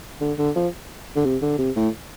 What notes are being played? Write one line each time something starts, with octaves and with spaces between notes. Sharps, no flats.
D3
D3
F3
D3
C3
D3
C3
A2